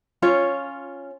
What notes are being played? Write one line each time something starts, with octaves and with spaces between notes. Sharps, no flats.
C#4 F4 C#5